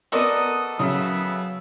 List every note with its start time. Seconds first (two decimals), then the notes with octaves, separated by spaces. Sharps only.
0.12 B3 F#4 A4 A#4 D5 D#5 D#6
0.79 C#3 F#3 B3 E5 D#6